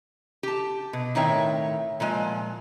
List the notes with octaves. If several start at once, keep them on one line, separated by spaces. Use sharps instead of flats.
G4 A5
B2
A2 D#3 C4 C#5 E5 G5
A#2 F3 G#3 G#5